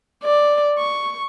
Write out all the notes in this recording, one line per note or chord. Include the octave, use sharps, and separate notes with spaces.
D5
C#6